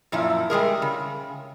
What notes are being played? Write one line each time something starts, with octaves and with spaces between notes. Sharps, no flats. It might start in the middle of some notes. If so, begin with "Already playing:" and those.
F#2 A#2 F3 E4
G3 G#3 G#4 A#4
C#3